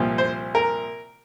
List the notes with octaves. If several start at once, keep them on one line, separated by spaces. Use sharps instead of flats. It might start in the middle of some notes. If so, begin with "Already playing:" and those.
Already playing: C2 A#2 F3
C5
A#4